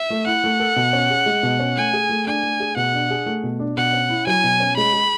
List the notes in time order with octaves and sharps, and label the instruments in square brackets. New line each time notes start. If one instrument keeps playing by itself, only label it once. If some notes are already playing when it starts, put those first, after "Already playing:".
Already playing: [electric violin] E5
[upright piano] A3
[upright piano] E4 [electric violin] F#5
[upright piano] A3
A4
B2
C#4
G#4
G#3
B2
C#4
[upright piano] A3 [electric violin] G#5
[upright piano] G#4
A3
[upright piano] D4 [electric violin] G#5
[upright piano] A3
G#4
[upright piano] B2 [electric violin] F#5
[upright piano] D4
G#4
A3
B2
D4
[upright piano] B2 [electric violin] F#5
[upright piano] C#4
E4
[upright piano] F#3 [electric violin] G#5
[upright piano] B2
C#4
[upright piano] G#3 [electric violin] B5
[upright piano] G#4